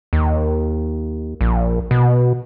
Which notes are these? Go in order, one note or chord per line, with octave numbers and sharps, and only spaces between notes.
D#2
A#1
B2